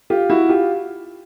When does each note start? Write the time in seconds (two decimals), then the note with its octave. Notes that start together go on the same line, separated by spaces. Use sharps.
0.10 F4 G4
0.30 E4 F#4
0.49 F4 G4